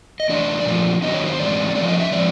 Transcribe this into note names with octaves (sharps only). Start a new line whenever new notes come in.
D#5
E3 A3 D4 D5
A#2 F3 A3
D#3 F#3 B3 D4 D#5
C#5
C5
A2 E3 G#3 C4 D5
F3 A3 C#4 D5
D#5
E5
F3 G#3 C4 D5